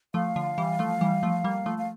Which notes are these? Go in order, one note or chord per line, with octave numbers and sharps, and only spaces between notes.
F3 A3 F5
D3 F3
E3 G3
F3 A3
E3 G3
F3 A3
G3 A#3
F3 A3
F5